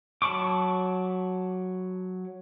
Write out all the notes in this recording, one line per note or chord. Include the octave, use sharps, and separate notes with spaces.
F#3 A5 B5 C#6 D6